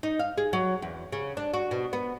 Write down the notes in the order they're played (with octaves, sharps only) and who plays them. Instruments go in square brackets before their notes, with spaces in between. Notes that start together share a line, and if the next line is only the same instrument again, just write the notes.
[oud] D#4
F5
G#4
F#3
E2
C#3
D4
F#4
B2
B3